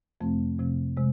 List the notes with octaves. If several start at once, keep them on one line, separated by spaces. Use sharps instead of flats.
F2 C3 F3 A3 C4
F2 C3 F3 A3 C4
C3 G#3